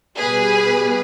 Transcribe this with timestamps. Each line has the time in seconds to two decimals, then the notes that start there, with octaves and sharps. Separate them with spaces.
0.19 B2 G3 G#4 B4